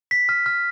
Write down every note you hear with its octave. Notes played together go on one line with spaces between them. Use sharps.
B6
F6
F6